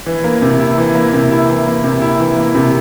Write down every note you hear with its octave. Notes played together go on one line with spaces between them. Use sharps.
E3
A#3
C3
E4
E3
A#3
C3
E4
E3
A#3
C3
E4
E3
A#3
C3